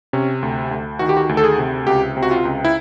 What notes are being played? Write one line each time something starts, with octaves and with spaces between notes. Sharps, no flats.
C3 C#4
D2
D2
D#3 F#4
G4
F#4
D2
A4
G#4
C3
C#2 G4
C3
F#4
F4
C#2
E4